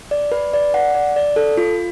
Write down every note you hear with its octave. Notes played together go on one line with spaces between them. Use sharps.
D5
B4
D5
F#5
D5
D5
A4
F4